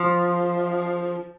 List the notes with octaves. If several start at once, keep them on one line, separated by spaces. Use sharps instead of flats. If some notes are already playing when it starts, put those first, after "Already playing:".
Already playing: F3